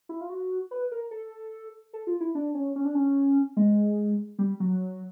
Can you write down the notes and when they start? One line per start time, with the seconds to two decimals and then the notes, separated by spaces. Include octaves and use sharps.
0.09 E4
0.21 F4
0.30 F#4
0.71 B4
0.92 A#4
1.11 A4
1.93 A4
2.07 F4
2.21 E4
2.35 D4
2.55 C#4
2.76 C#4
2.85 D4
2.95 C#4
3.57 G#3
4.39 G3
4.60 F#3